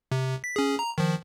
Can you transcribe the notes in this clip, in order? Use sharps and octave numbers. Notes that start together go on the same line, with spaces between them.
C3
B6
C#4 G#4
A#5
D#3 F3